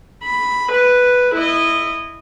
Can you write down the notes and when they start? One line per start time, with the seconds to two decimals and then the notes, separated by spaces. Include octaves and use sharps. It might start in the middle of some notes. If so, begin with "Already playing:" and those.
0.23 B5
0.71 B4
1.34 E4 D#5